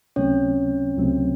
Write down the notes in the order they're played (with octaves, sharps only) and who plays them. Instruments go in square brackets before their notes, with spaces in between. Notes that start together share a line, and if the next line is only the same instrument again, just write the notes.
[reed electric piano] C#2 C3 F#3 A3 C4 [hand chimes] C#4 C#5
[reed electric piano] C#2 C3 F#3 A3 C4